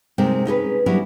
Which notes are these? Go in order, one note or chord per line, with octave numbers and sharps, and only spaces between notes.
C3 G#3 C4 D#4 A#4
C#4 D#4 G#4 B4
F#3 G3 C#4 D4 E4 G#4